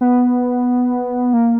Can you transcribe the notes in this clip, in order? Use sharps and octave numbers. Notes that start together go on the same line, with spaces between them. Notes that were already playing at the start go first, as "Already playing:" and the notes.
B3
A#3